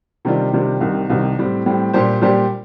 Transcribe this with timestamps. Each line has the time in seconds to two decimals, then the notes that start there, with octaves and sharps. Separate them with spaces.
0.25 C3 D#3 G3 D4 F4
0.53 C3 D#3 G3 D4 F4
0.81 C2 C3 D#3
1.10 C2 C3 D#3
1.38 A2 G3 C4
1.66 A2 G3 C4
1.93 A#2 G3 D4 G4 C5
2.21 A#2 G3 D4 G4 C5